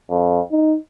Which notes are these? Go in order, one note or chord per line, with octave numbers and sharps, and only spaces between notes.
F2
D#4